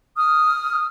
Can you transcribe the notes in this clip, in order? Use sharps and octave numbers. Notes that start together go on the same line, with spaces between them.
D#6 F6